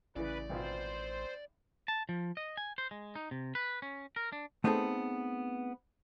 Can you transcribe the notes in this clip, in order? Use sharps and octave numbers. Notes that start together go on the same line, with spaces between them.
A1 C#3 E3 B4 D5
G#1 B2 F4 C5
A5
F3
D#5
G#5
C5
G#3
D#4
C3
B4
C#4
A#4
D4
A3 B3 C4 D#4 G#4 A4